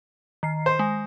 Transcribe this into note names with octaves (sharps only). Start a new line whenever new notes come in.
D#3 C7
C5
G#3